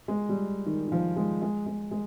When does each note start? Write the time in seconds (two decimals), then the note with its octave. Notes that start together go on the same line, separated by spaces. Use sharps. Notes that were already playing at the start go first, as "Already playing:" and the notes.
0.08 G#3
0.29 G3
0.66 D#3
0.88 D#3
0.92 F3
1.16 G#3
1.42 G#3
1.66 G#3
1.91 G#3